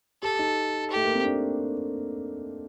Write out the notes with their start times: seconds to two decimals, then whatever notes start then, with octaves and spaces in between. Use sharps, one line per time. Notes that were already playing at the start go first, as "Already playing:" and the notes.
0.22 G4 A4
0.39 D#4
0.91 A3 G4
1.05 A#3
1.15 C4
1.25 D4